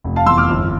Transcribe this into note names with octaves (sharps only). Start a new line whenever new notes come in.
F1
F5 A5
E2 C6 E6
D6 F6
G1